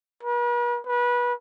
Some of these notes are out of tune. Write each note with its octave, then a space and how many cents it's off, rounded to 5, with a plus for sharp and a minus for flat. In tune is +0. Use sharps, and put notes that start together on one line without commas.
B4 -45
B4 -25